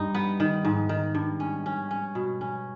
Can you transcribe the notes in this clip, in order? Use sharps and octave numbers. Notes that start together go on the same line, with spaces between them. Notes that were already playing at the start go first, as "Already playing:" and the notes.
Already playing: G2 D#4
B3
D#3
G#2
D#3
G2
C#4
C#4
C#4
B2
C#4